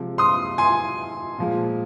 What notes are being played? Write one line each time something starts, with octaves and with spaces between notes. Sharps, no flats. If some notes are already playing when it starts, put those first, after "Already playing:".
Already playing: C3 F3 G#3
C6 D#6
G#5 C6
A#2 F3 G#3